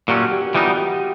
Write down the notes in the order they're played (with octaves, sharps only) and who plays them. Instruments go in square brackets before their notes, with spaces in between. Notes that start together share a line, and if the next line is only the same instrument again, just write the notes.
[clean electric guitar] A#2 F#3 A3 C#4 [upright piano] G4
[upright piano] F#4
G4
G4
[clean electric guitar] E3 G3 B3 D#4 [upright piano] F4
[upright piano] F#4
G4